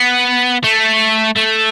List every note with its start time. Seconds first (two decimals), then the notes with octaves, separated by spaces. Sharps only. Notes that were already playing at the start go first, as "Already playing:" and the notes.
Already playing: B3
0.64 A3
1.37 A3